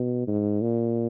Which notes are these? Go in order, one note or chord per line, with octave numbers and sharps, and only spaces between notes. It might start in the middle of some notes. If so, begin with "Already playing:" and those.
Already playing: B2
G#2
A#2